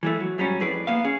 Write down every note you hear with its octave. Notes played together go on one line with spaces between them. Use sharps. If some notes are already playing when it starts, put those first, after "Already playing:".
E3 G#3 A3
F#3
G#2 F#3 G3 C#4
F2 A2 G#4 B4 D5
A#3 B3 F5
C#4 G#4